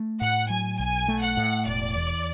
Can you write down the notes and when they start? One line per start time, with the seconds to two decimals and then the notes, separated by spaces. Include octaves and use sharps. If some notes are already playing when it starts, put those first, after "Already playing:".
Already playing: A3
0.21 A2 F#5
0.50 F#3 G#5
0.79 B1 G#5
1.08 A3
1.22 F#5
1.37 A2
1.67 E1 D5
1.96 E2